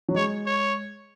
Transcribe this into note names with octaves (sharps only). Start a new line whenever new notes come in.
F#3
G#3 C#5
C#5